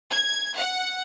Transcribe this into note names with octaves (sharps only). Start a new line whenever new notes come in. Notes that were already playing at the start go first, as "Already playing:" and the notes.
G#6
F#5